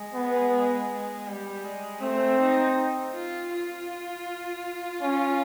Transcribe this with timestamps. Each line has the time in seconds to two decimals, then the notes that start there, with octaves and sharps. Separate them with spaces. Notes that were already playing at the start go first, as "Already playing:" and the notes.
Already playing: G#3
0.14 B3
1.27 G3
1.64 G#3
2.01 A3 C4
2.39 D#4
3.14 F4
3.53 F4
5.02 C#4